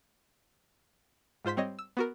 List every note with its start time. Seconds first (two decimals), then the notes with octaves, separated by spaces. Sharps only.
1.45 G#2 F4 C5 C6 B6
1.56 G3 C4 C#5 D#5
1.79 E6
1.97 B3 F#4 A#4